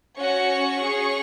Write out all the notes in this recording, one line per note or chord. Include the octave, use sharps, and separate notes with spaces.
C#4 F#4 C#6
C#4 G#4